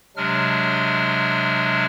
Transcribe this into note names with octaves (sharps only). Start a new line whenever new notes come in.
C3 F#3 G#3 D4 F6